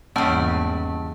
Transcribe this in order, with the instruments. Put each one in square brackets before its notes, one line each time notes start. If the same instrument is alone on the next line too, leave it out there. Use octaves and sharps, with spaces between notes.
[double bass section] G#1 E2 [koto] C#3 G3 [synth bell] A#3 C#4 A5